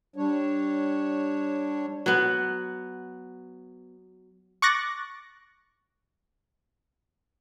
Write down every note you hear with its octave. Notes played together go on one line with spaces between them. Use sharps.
G3 D4 C#5
F#3 B3
C#6 D6 F#6 A6 A#6